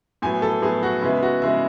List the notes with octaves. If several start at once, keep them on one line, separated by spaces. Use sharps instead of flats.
A2 F#3 B3 G#5
A4
A2 F#3 B3 G#4
F#4
C#3 G#3 B3 E4
F#4
C#3 G#3 B3 E4